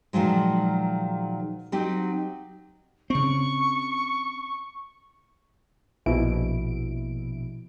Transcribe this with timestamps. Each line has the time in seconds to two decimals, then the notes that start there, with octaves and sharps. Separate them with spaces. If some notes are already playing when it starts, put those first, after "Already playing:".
0.13 A#2 D#3 F3 F#3 G#3
1.72 F#3 C4 D#4 G4
3.10 C#3 C4 C#6
6.06 A#1 B2 E4 D7